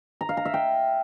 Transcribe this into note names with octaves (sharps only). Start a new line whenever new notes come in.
A#5
F5
A#5
E5
G5